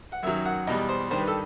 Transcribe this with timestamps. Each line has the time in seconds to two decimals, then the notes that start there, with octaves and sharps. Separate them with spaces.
0.12 F#5
0.23 F#2 D#3 F#3 E5
0.45 F#5
0.67 E2 B2 G3 D#5
0.89 C5
1.10 G2 D#3 G3 C5
1.18 B4
1.27 A4